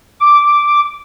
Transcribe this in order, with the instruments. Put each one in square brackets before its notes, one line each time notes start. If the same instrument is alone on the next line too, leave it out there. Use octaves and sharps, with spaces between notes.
[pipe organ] D6